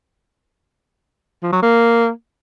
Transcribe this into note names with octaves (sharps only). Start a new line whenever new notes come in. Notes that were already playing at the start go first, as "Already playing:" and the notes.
F3
F#3
A#3